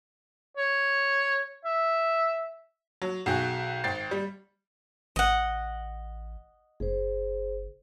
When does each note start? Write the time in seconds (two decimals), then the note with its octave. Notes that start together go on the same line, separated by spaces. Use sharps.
0.57 C#5
1.65 E5
3.02 F#3
3.26 B1 F#4 G#4 G5
3.84 G#1 G5 A6 C7
4.11 G3
5.16 A1 D#5 F#5
6.80 F#1 G#4 C5